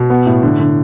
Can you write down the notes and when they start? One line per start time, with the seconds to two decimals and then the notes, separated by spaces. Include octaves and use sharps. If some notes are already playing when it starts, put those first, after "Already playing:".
Already playing: B2
0.10 B3
0.26 A2
0.43 D3
0.60 D3